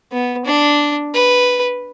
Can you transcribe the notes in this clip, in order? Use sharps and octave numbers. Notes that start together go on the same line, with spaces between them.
B3
D4
B4